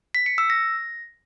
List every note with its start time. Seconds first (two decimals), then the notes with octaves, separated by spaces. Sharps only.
0.15 B6
0.26 C#7
0.38 E6
0.50 A#6